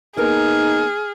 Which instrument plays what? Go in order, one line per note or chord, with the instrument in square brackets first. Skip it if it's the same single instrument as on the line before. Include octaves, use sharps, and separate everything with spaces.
[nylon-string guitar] A#3 B3 A#4 [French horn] D#4 [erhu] G#4 [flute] F6